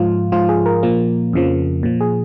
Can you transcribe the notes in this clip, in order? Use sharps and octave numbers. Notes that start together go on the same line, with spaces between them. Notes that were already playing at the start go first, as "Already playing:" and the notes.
Already playing: G#2 F3 F4
G#2 F3 F4
G#4
A#4
A#2 F3 A#3
F2 C#3 F3
A#2 F3
G#4